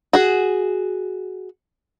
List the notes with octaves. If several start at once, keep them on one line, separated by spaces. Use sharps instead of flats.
F#4 G#4